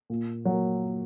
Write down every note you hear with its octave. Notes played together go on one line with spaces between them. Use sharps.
A#2
F#3 A#3